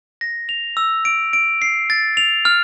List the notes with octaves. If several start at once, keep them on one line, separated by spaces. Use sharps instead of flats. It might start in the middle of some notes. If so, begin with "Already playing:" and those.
A#6
F7
E6
D7
D7
C7
A6
F7
F6